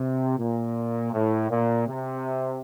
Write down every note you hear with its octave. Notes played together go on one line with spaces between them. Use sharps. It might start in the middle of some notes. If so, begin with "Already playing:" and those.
Already playing: C3
A#2
A2
A#2
C3